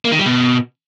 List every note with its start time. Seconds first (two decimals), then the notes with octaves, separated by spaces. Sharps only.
0.05 A#3
0.12 D#3
0.19 G3
0.26 B2